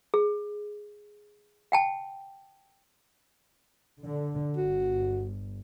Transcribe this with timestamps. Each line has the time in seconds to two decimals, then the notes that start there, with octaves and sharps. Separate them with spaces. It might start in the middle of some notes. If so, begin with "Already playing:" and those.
0.14 G#4
1.72 F#5 G5 A5
4.02 D3
4.57 G1 F#4